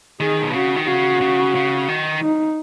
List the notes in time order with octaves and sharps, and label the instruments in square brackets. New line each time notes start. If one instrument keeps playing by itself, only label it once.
[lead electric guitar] D#3 [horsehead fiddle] G#4
[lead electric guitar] B2
[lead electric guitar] C#3 [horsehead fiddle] F#4
[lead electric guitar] D#3
[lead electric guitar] C#3 [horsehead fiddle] F#4
[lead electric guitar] C#3
C#3
D#3
[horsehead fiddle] D#4